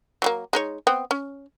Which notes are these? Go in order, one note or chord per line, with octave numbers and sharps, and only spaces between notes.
F#3 G3 A#3
G#3 D#4 C#5
B3 C4 G5
C#4